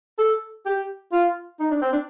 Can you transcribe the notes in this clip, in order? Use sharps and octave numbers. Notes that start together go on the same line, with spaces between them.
A4
G4
F4
D#4
D4
C4
D4